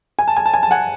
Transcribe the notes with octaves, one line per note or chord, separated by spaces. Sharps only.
G#5
A5
G#5
A5
G#5
A5
F#5 G#5